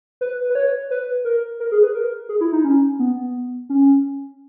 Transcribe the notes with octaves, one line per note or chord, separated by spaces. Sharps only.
B4
B4
C#5
B4
A#4
A#4
G#4
B4
A#4
G#4
E4
D#4
C#4
B3
C#4